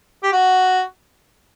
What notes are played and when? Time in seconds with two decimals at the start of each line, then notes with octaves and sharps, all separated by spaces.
0.23 G4
0.33 F#4